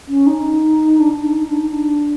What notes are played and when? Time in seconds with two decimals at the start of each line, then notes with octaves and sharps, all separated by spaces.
0.08 C#4
0.27 D#4
0.99 D4
1.11 D#4
1.23 D4
1.36 D#4
1.48 D4
1.60 D#4
1.73 D4